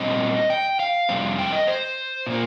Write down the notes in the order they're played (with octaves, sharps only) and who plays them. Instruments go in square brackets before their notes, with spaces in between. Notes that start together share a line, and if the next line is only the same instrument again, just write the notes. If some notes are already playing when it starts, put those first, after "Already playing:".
Already playing: [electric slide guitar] A#2 G3 C4 D#5
G5
F5
F2 C3 G3 C4
G5
D#5
C5
A#2 A#3